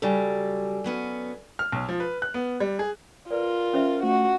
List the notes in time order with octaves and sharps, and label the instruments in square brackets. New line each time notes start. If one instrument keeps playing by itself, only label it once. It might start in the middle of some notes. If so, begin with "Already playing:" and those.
[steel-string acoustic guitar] C#3 F#3 G3 [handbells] A4 D5 G#5
[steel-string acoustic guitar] F#3 B3 C#4
[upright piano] F6
B1
F3
B4
F#6
B3
G3
G#4
[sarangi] F4 [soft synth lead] A#4 [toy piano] B4 D5
[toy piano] C#4 C5 E5
[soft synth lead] A3 [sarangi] F#4